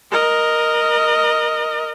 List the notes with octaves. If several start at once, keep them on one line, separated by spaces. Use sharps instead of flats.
A#4 D#5